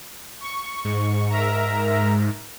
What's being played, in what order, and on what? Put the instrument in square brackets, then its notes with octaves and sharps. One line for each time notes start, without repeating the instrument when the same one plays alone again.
[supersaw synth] C#6
[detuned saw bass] G#2
[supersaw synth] A#4 E5 A#5